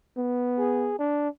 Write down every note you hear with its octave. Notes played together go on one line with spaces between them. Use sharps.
B3
G#4
D4